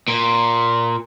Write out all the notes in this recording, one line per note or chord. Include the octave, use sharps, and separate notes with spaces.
A#2